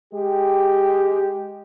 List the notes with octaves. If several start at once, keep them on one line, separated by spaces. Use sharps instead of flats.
G#3 G4